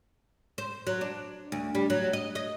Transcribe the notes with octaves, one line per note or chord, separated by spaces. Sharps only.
C5
F#3
D4
D2
G3
F#3
D#5
D#5